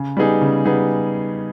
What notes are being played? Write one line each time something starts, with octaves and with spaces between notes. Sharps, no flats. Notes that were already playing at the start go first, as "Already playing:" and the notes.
Already playing: C#3
G3 B3 D#4 G#4
C#3
G3 B3 D#4 G#4